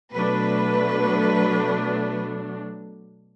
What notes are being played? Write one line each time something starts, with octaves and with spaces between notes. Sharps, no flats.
B2 F#3 A3 D4 B4